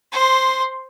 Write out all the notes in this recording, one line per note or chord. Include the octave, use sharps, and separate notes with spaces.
C5 C6